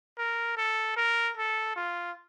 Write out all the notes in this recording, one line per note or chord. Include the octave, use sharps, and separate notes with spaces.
A#4
A4
A#4
A4
F4